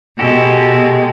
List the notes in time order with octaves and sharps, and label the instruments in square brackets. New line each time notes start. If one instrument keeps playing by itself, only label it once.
[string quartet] B2 G#3 [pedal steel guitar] F#4 G4 A4